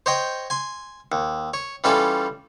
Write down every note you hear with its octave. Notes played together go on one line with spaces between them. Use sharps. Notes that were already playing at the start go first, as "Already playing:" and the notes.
C5 C#5 D#5 G5
G#5 C6
D#2
C#5
E3 G3 C#4 F4 A4